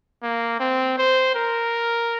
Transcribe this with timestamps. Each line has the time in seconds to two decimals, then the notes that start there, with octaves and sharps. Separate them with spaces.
0.23 A#3
0.60 C4
0.98 C5
1.35 A#4